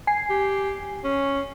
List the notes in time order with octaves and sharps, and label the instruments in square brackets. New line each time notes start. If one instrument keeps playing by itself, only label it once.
[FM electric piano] G#5 C7
[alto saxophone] G4
C#4